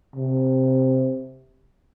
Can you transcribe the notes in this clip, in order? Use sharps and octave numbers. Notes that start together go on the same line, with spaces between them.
C3